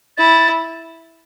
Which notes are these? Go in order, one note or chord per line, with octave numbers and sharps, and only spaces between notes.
E4 A6